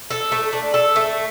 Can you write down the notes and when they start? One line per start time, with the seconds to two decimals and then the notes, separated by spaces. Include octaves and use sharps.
0.10 A4
0.32 A3
0.53 D4
0.74 A4
0.96 A3